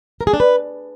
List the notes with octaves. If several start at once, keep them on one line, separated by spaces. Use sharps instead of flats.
A#4
G#4
D4
B4